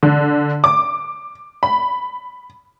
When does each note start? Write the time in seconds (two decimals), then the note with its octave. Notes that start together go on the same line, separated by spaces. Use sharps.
0.03 D3
0.64 D6
1.63 B5